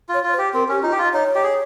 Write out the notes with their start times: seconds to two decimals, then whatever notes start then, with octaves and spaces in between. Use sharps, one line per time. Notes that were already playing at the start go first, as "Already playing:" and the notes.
0.09 F4
0.14 C#5
0.24 F4
0.33 C5
0.38 G4
0.54 C4 A#4
0.69 C#4 G4
0.83 D#4 F4
0.92 G4
0.98 F4
1.14 D#4 C#5
1.35 G4
1.43 G#4